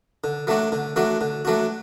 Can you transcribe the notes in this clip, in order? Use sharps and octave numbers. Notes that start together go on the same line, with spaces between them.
D3
F#3 A3 D4 F#4
D3
F#3 A3 D4 F#4
D3
F#3 A3 D4 F#4